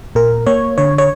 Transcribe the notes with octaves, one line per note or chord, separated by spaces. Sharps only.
A#2 A#4
A#3 C#5
D3 C#5
C#5